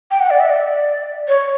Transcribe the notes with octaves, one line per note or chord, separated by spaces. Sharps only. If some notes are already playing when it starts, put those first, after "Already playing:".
G5
F#5
D5
E5
D5
C#5